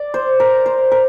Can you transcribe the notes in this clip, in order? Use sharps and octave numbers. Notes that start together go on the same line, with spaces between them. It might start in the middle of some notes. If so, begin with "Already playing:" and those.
Already playing: D5
C5
A#4
C5
A#4